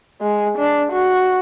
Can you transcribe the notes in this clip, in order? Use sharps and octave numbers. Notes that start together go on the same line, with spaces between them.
G#3
D4
F#4